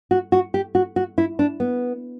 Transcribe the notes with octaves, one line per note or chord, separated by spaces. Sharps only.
F#4
F#4
G4
F#4
F#4
E4
D4
B3